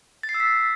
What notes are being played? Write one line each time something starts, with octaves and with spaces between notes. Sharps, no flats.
A6
C7
E6
B6